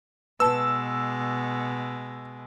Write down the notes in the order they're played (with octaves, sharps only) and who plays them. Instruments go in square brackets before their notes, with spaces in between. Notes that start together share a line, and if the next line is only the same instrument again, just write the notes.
[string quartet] B2 G#3 [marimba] B4 A5 [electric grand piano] E6